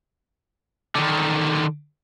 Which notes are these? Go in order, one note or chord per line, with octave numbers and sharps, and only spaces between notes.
D3 D#3